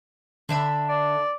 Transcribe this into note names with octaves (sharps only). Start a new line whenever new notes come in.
D3 D4 E5 B5
D5